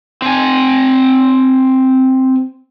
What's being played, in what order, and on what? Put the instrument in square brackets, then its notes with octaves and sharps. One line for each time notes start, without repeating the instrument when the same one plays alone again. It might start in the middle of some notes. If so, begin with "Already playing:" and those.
[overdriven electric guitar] C4 G#5